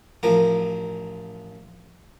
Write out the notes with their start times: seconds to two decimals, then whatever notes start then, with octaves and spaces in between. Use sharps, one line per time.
0.23 A1 F3 A#4